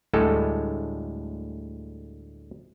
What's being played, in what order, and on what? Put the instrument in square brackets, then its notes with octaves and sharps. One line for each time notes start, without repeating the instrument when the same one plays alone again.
[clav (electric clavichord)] D2 A2 G3 G#3 A4